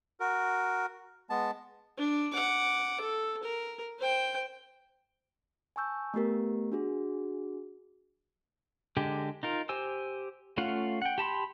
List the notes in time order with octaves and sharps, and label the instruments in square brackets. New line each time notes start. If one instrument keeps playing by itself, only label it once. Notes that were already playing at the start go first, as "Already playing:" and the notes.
[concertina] F#4 A#4
G#3 B3 A5
[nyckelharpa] D4
F#5 D6
A4
A#4
C5 G5
[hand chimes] G#5 A5 C#6 E6 G6
A3 B3 G4 A#4
D4 F#4 G#4
[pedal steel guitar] D3 G#3 G4
D#4 F4 A#4
G4 C5 G#5 E6
A3 C#4 F4 F5 F#5
F#5 G5
G4 A5 B5 C6